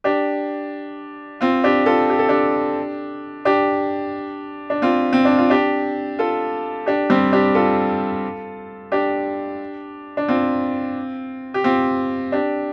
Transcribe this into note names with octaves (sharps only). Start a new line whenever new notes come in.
D4 G4
C4 F4
D4 G4
F4 A4
G4
A4
D4 G4
D4 G4
D4
C4 F4
C4
D4
F4
D4 G4
F4 A4
D4 G4
G3 C4
D4 G4
F4 A4
D4 G4
D4
C4 F4
G4
C4 F4
D4 G4